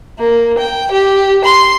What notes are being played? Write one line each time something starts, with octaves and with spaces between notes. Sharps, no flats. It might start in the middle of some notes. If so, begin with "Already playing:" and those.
A#3
G5
G4
C6